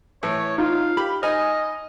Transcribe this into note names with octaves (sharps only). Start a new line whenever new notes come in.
A2 E3 C#5
D#4 F4 F5
G4 B5
D#4 D#5 G#5 F6